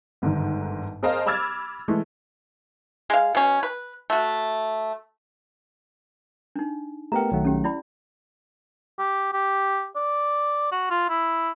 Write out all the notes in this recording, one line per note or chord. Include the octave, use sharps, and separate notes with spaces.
G1 G#2 D3 D#3
G#4 A#4 C5 D#5 F5 A5
B5 D6 E6 F6 G#6 A6
E3 G#3 A3
G#3 F5
B2 C#4
B4
A3 F#4
D4 D#4
A3 B3 G4 A#4 G5 A#5
B1 D#3 F#3 A3 F#5
C#4 G4
E4 D5 B5
G4
G4
D5
F#4
F4
E4